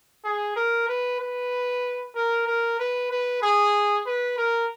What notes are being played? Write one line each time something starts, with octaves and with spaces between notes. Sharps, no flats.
G#4
A#4
B4
B4
A#4
A#4
B4
B4
G#4
B4
A#4